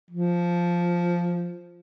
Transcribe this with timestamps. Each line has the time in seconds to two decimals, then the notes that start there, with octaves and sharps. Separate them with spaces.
0.11 F3